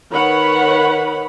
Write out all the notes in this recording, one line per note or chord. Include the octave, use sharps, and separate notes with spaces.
D#3 B4 C#5 F#5 B5